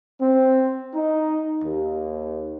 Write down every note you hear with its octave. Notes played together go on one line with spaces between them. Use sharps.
C4
D#4
D#2